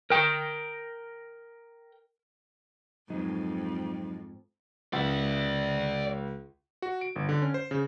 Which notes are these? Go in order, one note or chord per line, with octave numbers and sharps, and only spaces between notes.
A#4 G5
F2 G#2 F#3 D#4
C#2 D5 E5
F#4
D7
G1
D3
C#4
C5
C#3